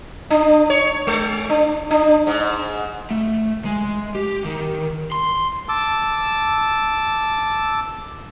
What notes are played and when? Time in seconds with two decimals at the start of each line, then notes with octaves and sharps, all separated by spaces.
0.30 D4
0.70 C#5
1.07 G#3
1.50 D4
1.91 D4
2.27 G#2
3.11 A3
3.65 G#3
4.15 G4
4.45 D#3
5.12 C6
5.69 A5 D6 E6